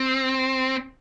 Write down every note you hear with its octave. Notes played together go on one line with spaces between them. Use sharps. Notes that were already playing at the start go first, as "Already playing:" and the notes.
Already playing: C4